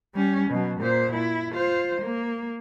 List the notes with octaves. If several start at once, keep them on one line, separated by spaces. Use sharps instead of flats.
G3 C#4
B2 F#3
A#2 C5
E4
F4 C5
A#3